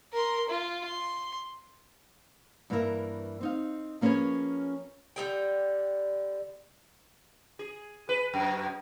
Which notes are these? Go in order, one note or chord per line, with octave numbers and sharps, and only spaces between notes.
A#4 C6
F4
C6
G2 E3 A#3 C#4 A#4 E5
C4 D#4 F5
F3 A#3 C#4 G#4 B4 C#5
D3 G3 G#4 G5
G#4
B4
F#2